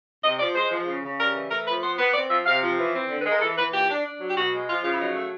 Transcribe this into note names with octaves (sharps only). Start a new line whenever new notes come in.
C3 D#5
F3 D5
G#3 C5
F3
C#3
C#3
G3 A#4
E3
A3 A#4
F3 B4
B3 C5
B3
C4 D5
F3 E5
C3 F5
F3
E3
C4
D3
B4
G#3
A#4
E3 A4
E3 B4
A#2 G4
D4
D4
F#3
G4
B2 F#4
G#3
F3 F4
C#3 F4
E4
F#3 D#4
A3